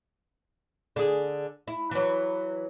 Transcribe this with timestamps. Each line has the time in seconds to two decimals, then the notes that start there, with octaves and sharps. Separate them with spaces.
0.96 D3 G#4
1.67 E4
1.91 E3 F#3